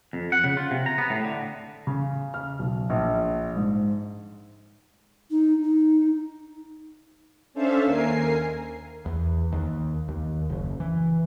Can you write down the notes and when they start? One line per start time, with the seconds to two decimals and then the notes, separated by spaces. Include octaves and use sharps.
0.13 F2
0.32 F#5
0.44 C#3
0.57 F4
0.71 C3
0.86 A#5
0.98 B3
1.10 A2
1.24 D3
1.87 C#3
2.34 F6
2.59 B1
2.90 A#1
3.56 G#2
5.31 D#4
5.64 D#4
7.54 C#4 D4 A4 C5 E5 F5
7.85 D#2 A#4 G#5 C7
9.06 E2
9.52 D#2
10.09 D#2
10.50 F#1
10.80 E3